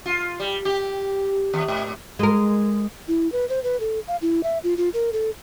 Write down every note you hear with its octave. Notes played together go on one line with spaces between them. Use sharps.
F4
G3
G4
D#2
G#2
G#3 A#4
E4
B4
C5
B4
A4
F5
E4
E5
F4
F4
A#4
A4